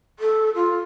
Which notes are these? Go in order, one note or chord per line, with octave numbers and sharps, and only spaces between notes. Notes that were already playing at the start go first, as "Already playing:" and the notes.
A4
F4